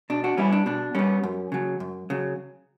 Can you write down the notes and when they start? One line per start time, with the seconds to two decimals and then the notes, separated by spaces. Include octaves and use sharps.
0.10 B2 D4
0.24 D4 F#4
0.37 G3 B3 C#4 E4
0.53 D4
0.66 B2 D4
0.95 G3 B3 C#4
1.24 F#2
1.52 C#3 F#3
1.80 F#2
2.10 C#3 F#3